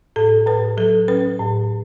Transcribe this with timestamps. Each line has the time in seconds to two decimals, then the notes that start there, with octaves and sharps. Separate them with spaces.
0.16 A2 A4
0.47 A2 B4
0.77 F#3 A4
1.08 C#4 B4
1.39 A2